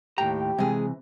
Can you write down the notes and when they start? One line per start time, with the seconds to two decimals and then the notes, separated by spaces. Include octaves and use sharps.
0.18 D#2 A2 G4 G5 A#5
0.58 C3 E3 G#3 G#4